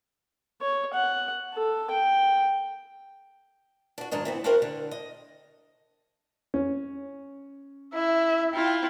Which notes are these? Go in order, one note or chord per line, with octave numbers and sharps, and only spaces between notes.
C#5
F#5
A4
G5
D4 F#4
G#2 D#3 F#3 D4 D#5
E3 B3 C4
D4 E4 F#4 G4 A#4 C5
D3
D#5
C#4
E4 E5
E4 F4 G5